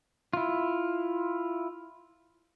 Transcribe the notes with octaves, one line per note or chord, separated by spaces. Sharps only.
E4 F4